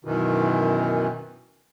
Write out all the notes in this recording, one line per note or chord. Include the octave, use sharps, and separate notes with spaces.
F#2 B2 D#3 E3